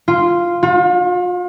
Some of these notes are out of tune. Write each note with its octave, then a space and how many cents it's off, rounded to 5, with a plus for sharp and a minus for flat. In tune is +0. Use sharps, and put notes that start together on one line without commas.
F4 -5
F4 +40